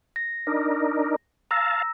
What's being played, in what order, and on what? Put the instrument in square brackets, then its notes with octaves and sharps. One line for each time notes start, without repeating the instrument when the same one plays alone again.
[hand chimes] A#6
[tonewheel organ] D4 D#4 A#4
[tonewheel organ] F5 A5 [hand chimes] A#5 E6 A#6